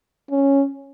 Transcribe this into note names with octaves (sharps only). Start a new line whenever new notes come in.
C#4